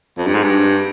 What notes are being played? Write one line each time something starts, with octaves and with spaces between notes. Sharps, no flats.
F2
G2
G#2
G2